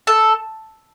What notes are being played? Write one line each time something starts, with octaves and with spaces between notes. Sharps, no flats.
A4